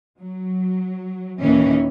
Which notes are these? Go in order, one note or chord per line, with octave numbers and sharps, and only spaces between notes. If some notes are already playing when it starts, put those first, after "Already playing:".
F#3
D#2 A#2 D#3 E3 C#4